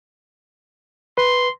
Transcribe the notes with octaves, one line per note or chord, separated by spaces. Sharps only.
B4 C6